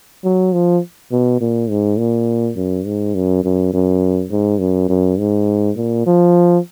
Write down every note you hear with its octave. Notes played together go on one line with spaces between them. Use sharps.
F#3
F3
B2
A#2
G#2
A#2
F#2
G#2
F#2
F#2
F#2
G#2
F#2
F#2
G#2
A#2
F3